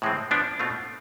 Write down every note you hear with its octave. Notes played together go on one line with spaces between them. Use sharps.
A2 E3 G#3 C4
F3 B3 D4
B2 A3 C4 F4